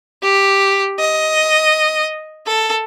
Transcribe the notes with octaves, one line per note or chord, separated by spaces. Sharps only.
G4
D#5
A4